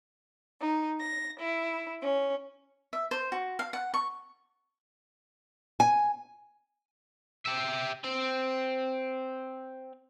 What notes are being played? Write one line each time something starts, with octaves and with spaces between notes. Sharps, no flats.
D#4
A#6
E4
C#4
E5
C5
F#4
F5
F#5
C#6
G#5
G4 E5
C4